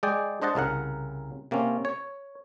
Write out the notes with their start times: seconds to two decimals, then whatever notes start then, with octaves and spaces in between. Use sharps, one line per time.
0.03 G#3 G#4 D5 G5
0.42 D4 C5 D#5 F#5 A5
0.55 C2 C#3 A#4 F#5
1.51 C3 A#3 C4 C#4
1.85 C#5